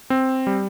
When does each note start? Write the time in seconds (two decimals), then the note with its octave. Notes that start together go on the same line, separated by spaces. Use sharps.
0.10 C4
0.47 G3